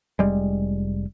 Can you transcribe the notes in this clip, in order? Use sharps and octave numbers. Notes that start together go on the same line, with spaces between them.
F1 G3 G#3